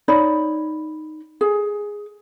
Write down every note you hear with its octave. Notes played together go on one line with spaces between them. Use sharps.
D#4 C#5 D5 B5
G#4